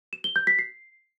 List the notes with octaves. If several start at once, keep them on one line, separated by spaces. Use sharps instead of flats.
E7
G7
G6
B6
C7